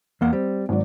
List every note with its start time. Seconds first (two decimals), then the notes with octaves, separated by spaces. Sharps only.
0.21 E2 A#3 F#5
0.33 G3 C4
0.69 G#1 F#3 D5